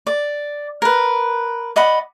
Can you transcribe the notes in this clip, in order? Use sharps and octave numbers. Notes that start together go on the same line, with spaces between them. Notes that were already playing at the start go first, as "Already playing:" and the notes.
D5
A#4 B4
D5 D#5 F#5 B5